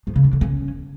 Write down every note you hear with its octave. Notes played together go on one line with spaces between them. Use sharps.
F3
C#3
D4
D3
C#4